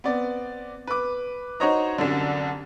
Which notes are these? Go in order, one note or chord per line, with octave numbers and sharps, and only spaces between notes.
B3 C4 D5
B4 D6
D#4 F#4 C5 C#5 D#5 A#5
C2 F#2 D3